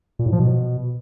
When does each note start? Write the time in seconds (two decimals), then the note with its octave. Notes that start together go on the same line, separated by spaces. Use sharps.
0.19 A#2
0.26 A2
0.33 F3
0.39 B2